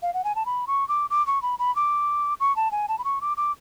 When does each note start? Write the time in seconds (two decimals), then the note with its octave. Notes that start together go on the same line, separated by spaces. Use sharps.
0.02 F5
0.14 F#5
0.24 G#5
0.35 A5
0.46 B5
0.67 C#6
0.88 D6
1.10 D6
1.27 C#6
1.42 B5
1.59 B5
1.76 D6
2.40 C#6
2.56 A5
2.71 G#5
2.88 A5
2.98 B5
3.04 C#6
3.21 D6
3.37 D6